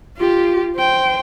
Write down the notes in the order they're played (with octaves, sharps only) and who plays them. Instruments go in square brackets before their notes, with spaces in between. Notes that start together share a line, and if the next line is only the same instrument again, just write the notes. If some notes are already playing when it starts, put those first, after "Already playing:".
[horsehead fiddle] F4 G4
C5 G5